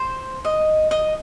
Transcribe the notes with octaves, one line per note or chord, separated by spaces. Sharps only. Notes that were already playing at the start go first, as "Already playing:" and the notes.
Already playing: C5
D#5
D#5